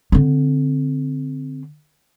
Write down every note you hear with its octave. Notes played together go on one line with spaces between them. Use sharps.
D3 C4